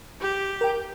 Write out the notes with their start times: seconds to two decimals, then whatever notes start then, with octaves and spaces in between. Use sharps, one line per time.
0.21 G4
0.61 A#4 G5